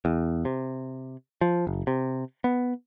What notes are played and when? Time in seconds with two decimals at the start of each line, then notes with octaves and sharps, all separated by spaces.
0.05 E2
0.45 C3
1.41 F3
1.67 F#1
1.87 C3
2.44 B3